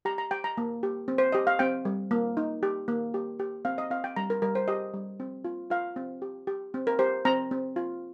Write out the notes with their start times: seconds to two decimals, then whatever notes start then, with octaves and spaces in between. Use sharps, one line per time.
0.05 G4 A#5
0.18 A#5
0.31 G4 G5
0.44 A#5
0.57 A#3
0.83 G4
1.08 C4
1.18 C5
1.32 G4 D#5
1.47 F5
1.59 C4 G5
1.85 G3
2.11 A#3
2.37 D#4
2.63 G4
2.88 A#3
3.14 G4
3.39 G4
3.65 C4 F5
3.78 D#5
3.90 C4 F5
4.04 G5
4.16 G3 A#5
4.30 A#4
4.42 G3 A#4
4.55 C5
4.68 G4 D#5
4.94 G3
5.20 C4
5.45 F4
5.70 F4 F5
5.96 C4
6.22 G4
6.47 G4
6.74 C4
6.87 A#4
6.99 G4 C5
7.25 C4 A#5
7.51 C4
7.76 F4